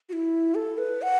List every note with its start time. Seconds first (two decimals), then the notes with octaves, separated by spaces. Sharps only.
0.09 F#4
0.13 E4
0.55 A4
0.78 B4
1.02 F#5